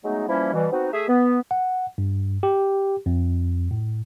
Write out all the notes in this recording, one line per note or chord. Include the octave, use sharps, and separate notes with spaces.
F#3 G#3 A3 B3 D#4
E3 F3 G3 A#3 C#4 E4
B2 E3 G3
B3 C4 D#4 F#4
A3 G#4 E5
B3
F#5
G2
G4
F2
A2